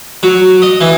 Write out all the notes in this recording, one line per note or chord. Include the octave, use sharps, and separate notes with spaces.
F#3
D#5
E3